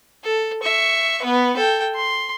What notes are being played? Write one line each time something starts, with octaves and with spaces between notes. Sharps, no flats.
A4
E5 C#6
B3 B4
A4 G5
C6